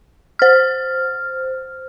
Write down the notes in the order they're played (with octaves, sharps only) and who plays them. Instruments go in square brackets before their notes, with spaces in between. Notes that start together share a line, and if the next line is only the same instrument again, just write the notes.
[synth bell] C5 F6